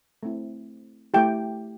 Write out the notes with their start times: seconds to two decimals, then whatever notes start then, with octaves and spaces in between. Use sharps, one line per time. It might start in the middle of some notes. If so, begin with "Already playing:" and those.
0.23 A3 C4 E4
1.14 A3 E4 G4 G5